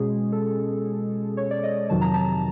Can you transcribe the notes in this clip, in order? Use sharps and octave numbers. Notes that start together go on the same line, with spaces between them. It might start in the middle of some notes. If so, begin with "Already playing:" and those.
Already playing: B2 G#3 C#4 G#4
A4
C#5
D5
D#5
F2 C3 D#3 F#3 A5
A#5
A5